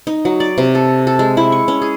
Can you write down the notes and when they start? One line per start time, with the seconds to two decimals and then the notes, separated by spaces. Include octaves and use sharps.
0.07 D#4
0.25 F#3
0.40 D5
0.58 C3
0.75 A4
1.07 A4
1.19 G#3
1.37 E4
1.52 C#6
1.68 C#4
1.82 G#4